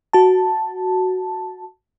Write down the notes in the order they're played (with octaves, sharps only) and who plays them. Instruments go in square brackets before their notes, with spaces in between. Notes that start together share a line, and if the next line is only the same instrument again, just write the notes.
[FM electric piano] F#4 A5